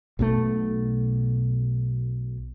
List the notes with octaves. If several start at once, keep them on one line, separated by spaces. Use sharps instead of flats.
B1 B2 D#3 A3